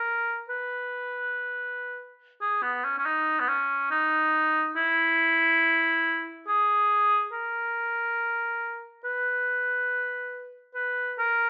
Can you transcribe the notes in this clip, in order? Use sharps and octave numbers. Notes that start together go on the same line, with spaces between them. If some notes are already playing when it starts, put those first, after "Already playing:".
Already playing: A#4
B4
G#4
B3
C#4
C#4
D#4
B3
C#4
D#4
E4
G#4
A#4
B4
B4
A#4